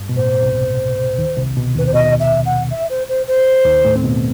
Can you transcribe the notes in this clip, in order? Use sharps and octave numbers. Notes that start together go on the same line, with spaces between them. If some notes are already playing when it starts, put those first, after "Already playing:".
Already playing: G2
B2
A2 C5
C2 C3
D#2 D#3
C2 C3
B2
D#2 D#3 B4
C5
B2 D#5
E5
F#5
E5
C5
C5
C5
D#2 D#3
A2 A3
C4
B2 B3